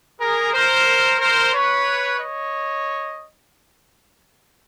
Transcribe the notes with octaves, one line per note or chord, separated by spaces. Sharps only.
G#4 A#4
A#4 C5
A#4 C5
B4 C#5
C#5 D#5